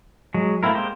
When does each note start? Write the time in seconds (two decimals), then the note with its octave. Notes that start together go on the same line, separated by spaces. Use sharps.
0.34 F#3 G#3
0.63 A3 A#3 C4 E4 A#4
0.74 G#3 A#3 G4 C5